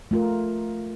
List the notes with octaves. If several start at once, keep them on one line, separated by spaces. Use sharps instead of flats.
A3 F4 A#4